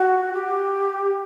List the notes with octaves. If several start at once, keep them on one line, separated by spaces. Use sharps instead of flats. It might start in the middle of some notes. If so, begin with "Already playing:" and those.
Already playing: F#4
G4